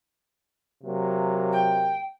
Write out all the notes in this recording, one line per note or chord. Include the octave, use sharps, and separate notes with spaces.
C3 F#3 A#3
G5